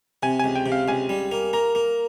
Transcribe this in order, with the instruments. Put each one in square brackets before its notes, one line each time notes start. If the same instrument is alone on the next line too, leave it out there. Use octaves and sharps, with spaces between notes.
[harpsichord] C3 [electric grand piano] G#5
[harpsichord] C#2 [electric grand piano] G#5
[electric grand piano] G5
[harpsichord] C3
[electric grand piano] F5
[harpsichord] C#2 [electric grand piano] G#5
[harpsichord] G3
A#3
[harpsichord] A#3 [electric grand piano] A#5
[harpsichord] A#3